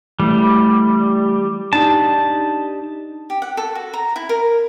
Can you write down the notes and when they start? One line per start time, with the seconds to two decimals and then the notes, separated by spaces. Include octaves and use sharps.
0.20 E3 G3 A3
1.73 D4 D#4 G4 A5
3.30 G4
3.42 F#5
3.57 A4
3.75 F#4
3.94 A#5
4.16 E4
4.29 A#4